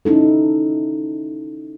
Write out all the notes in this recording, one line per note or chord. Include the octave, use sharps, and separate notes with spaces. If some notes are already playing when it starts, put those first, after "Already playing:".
C#4 D#4 E4 A4